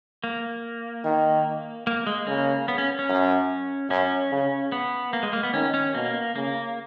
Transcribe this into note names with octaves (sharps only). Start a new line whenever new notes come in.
A#3
D#3
A#3
G#3
C#3 A#3
B3
C#4
C#4
F#2
F#2 C#4
C#3
B3
A#3
G#3
A#3
B3
D#3 C#4
C#4
B2 A#3
C#3 A#3